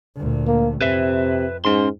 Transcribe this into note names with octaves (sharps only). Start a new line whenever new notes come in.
D2 A#2
A#3
F2 C3 B4 E5
G#2 C#4 C6